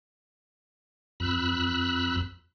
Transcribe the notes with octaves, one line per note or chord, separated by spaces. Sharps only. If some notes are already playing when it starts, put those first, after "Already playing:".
F2 B5 E6 F#6